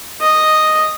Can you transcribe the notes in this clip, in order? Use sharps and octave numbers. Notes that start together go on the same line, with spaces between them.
D#5